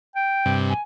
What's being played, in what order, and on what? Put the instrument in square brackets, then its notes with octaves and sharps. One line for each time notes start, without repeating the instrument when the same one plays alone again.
[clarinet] G5
[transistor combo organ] G2 C3
[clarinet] G#5